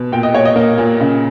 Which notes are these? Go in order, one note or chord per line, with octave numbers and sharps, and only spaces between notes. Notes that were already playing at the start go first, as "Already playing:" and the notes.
Already playing: B2
A#2 G5
D#5
A#2 C#5
D#5
A#3
A#2
C#3